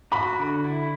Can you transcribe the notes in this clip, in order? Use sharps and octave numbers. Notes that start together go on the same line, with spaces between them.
F#4 B5
D3
E4